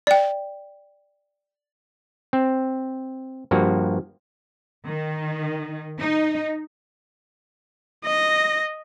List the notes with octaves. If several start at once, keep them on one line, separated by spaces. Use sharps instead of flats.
D5 G5
C4
G2 F3 A#3 F#4
D#3
D#4
D#5 A#6